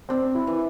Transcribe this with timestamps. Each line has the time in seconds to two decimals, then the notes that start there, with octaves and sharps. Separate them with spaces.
0.09 C4 D4
0.35 E4
0.47 E3